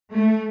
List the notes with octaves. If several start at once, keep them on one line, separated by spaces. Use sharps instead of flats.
A3